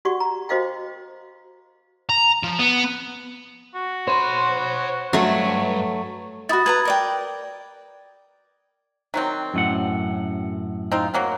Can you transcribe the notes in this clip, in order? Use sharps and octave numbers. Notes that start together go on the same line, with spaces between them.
F#4 G4 D5 F#5 C#6
A#5
F#4 C5 D#5 F5 G5
A#5
F3
B3
F#4
C5 C#5 B5
G2 F#3 A3
E4 F#4 B5 D#6 A6
B4 A5 A#5 G#6
A#4 D5 G5
D#3 F#3 C4
F#2 A2 F#5
C4 D#4 F4
F#3 A#3 C4